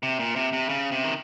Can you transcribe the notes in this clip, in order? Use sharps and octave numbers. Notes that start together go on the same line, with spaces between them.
C3
A#2
C3
C3
C#3
C3
D#3